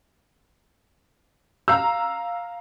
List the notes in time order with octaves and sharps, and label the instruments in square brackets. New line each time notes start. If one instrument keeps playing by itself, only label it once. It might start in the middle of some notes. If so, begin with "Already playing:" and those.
[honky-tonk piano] F5 A#5 E6